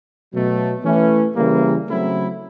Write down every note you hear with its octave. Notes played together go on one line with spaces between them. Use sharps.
B2 F#3 A3
E3 A3 C#4
C#3 E3 G3 A#3
C#3 F#3 A3 C4 E4